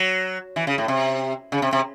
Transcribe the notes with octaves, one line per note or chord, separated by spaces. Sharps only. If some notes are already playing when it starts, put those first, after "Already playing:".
Already playing: F#3
E3
C#3
A2
C3
C#3
C3
C3